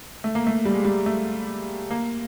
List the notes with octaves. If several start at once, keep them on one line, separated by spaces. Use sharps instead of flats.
A3
A#3
A3
G3
G#3
G3
A3
A#3